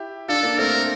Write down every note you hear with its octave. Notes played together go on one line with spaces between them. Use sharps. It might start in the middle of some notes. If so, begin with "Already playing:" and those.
Already playing: E4 G4
D4 F4 A4
A#3 D4
A3 C4 A#4